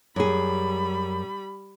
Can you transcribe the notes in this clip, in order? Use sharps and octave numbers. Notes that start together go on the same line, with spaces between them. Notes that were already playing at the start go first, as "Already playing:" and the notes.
F#2 G3 G#4 B5